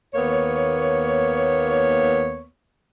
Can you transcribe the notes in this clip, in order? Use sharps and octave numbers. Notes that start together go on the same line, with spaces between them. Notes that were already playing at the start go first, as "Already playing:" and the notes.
D#2 A#3 B3 C#5